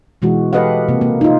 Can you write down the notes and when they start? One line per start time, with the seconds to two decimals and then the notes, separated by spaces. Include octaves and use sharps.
0.22 B2 E3 G#3 F#4
0.53 G4 A4 B4 D#5 F5 F#5
0.88 C3 A#3
1.01 A#3
1.21 D#4 F4